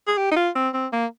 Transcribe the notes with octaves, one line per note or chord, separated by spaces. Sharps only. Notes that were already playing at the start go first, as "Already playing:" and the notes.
G#4
G4
D#4
F4
C4
C4
A#3